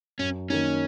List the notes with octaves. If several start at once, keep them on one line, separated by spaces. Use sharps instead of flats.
F#2 C#4
D#3 A#3 C#4 D#4